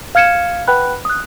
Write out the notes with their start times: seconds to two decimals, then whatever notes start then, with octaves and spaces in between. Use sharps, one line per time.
0.15 F5 F6 G#6 C#7 D#7 E7
0.68 B4 F#5 G5 B5 F#6
1.05 D#6 F#6